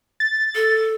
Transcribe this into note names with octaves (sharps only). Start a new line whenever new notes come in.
A6
A4